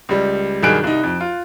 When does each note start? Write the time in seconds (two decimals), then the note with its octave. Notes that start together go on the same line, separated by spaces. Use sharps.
0.09 C#2 G3
0.63 B1 G2 D#3 G#4 F#6 D7
0.84 C2 D#4
1.03 F2
1.21 F4